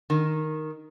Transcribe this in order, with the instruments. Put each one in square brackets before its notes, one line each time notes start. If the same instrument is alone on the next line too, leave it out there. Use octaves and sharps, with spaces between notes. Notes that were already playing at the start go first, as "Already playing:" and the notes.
[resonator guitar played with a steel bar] D#3